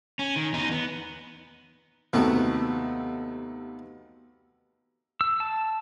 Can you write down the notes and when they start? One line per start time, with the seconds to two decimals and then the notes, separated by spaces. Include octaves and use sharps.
0.19 C#4
0.36 D#3
0.53 E2 D#4
0.71 B3
2.13 D#2 C3 A3 B3 F#4
5.21 E6
5.40 A5